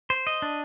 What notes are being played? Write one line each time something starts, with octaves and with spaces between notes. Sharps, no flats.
C5
D#5
D4